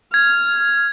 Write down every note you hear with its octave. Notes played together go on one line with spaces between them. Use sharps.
F6 G#6